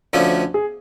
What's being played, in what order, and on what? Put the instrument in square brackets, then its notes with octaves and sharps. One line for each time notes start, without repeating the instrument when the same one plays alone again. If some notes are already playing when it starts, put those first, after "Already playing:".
[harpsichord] D2 D3 F3 A3 C#4 [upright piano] D4
[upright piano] G#4